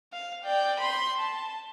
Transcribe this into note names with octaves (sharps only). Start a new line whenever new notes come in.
F5
D5 G5
B5 C6
A5